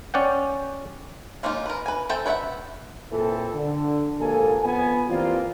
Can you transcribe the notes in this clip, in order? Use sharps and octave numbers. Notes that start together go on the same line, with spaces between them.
C#4 D5 F#5 G5
G#3 A#3 C#4 D#4 F4
A#4 B4
B4 G#5
C4 A4 E5 G5 A5
B4 C#5 D5 E5 F#5
A#2 E3 C4 A4
D3
A#1 D#2 G#2 A#3 A4 G#5
F2 B3 G#5
E3 G3 A#3 C4 F4